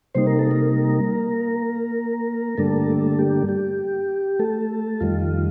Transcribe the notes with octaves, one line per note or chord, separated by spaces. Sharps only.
C3 G3 A#3 D#4 C5
A#4
A4
A#3 A#4
G2 D3 G3 A3 A#3 D4 A4
G4
G4
A3 A4
F2 D#3 G3 F4